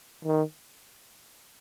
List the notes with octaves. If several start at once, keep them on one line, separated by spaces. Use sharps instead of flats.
D#3